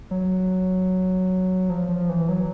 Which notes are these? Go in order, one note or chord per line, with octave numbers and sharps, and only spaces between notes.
F#3
F3
F3
E3
F#3